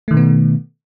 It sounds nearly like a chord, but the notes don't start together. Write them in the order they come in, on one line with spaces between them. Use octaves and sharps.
A3 D#3 B2 B3